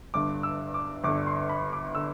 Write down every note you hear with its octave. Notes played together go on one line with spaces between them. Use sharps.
G1 G2 D3 D6
E6
D6
G1 G2 D3 D6
C6
B5
D6
D3 E6